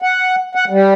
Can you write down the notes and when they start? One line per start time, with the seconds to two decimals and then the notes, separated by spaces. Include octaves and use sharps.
0.02 F#5
0.55 F#5
0.70 G3